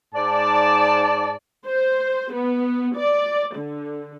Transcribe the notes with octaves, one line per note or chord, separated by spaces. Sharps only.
G#2 D5 A5
C5
B3
D5
D3